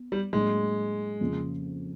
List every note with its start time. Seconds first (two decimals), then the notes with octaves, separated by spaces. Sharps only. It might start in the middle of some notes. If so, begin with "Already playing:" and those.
Already playing: B3
0.12 G3
0.33 A2 F#3 G#3 A#3 D4
1.21 F2 C#3 F3 A#3